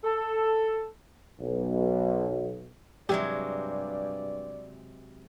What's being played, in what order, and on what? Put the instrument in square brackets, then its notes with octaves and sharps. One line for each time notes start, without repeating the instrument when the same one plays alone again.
[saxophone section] A4
[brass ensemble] B1
[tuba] G2 [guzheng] C3 F#3 G#3 [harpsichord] G4 [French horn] D5